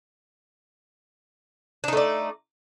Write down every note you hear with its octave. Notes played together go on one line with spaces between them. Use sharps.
A3 D4 D#4 D5